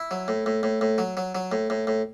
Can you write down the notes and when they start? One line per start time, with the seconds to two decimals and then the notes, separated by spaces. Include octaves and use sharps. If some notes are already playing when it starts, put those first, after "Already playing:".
Already playing: E4
0.11 F#3
0.28 A2
0.46 A2
0.63 A2
0.81 A2
0.98 F#3
1.17 F#3
1.35 F#3
1.52 A2
1.70 A2
1.87 A2